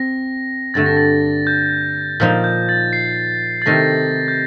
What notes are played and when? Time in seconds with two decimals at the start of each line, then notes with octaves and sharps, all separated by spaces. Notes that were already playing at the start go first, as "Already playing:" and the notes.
Already playing: C4 A#6
0.74 G2 D3 A3 A6
0.86 A#6
0.97 A6
1.47 G6
2.20 A#2 F3 A#3 D#4
2.44 G6
2.69 A6
2.93 C7
3.62 A6
3.66 C3 D#3 A3 D#4 A#6
4.28 G6